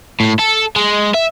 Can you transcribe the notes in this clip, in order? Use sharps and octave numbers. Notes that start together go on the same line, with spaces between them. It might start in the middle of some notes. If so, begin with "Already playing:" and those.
A2
A4
G#3
E5